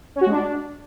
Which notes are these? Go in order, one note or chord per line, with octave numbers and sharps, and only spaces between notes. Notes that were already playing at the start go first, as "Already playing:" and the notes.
C#4
F#4
G#3
D4